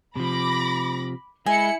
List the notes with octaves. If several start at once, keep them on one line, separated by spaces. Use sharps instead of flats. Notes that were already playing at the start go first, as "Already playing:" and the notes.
C3 F3 B5 D6 A#6
G#3 E4 G#5 C#7